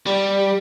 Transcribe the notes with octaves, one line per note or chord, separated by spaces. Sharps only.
G3